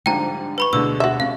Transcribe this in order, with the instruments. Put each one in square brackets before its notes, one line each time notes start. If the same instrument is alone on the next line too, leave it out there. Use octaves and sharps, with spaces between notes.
[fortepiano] G#2 D3 F3 [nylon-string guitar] G3 D4 [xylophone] G5 A#5
[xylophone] B4 B5 C#6
[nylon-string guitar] D2 B2 [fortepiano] D3 G#3 [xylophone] E6
[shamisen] F#4 E5
[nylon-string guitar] C#4 D4 [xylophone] F5